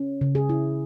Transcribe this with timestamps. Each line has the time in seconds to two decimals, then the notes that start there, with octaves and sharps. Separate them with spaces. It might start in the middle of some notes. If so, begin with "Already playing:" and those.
Already playing: C#4
0.21 C#3
0.35 G#4
0.49 E4